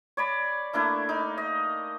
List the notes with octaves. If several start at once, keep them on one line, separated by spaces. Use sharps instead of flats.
C#5 D5 B5
A3 A#3 D4 E4
D#4
D#5